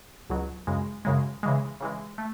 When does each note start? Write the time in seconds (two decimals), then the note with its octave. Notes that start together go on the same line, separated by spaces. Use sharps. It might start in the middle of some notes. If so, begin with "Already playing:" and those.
0.30 C#2 B2 F#3
0.67 F#2 C#3 G#3
1.05 F#2 C#3 G#3
1.43 C#3 E3 G#3
1.81 C#3 E3 G#3
2.18 A3